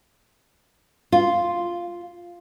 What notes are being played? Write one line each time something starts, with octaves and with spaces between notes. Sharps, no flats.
F4